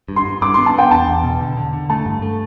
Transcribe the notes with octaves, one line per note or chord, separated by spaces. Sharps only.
G2
C6
G2
G2 D6
B3 C6
A5
B3 G5
E2 A5
E2
B2
D3
D3
D3
A3 A5
G2
A3